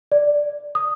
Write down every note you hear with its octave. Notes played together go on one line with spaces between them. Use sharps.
D5
D#6